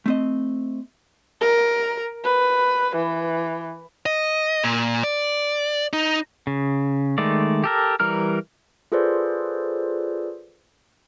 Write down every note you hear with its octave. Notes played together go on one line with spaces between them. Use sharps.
A3 C4 D#5
A#4
B4
E3
D#5
A#2
D5
D#4
C#3
D#3 G#3 A3 D5
G4 A4 A#4
E3 G3 A#4 F6
F4 G#4 A4 B4 C5 D5